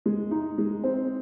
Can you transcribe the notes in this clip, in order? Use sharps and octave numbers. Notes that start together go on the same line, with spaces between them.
G#3
D#4
G#3
C4